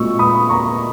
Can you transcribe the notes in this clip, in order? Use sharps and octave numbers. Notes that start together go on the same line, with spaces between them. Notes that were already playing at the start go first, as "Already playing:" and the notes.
Already playing: A#2 G#3 C#6 E6
B5 D#6
A#5 C#6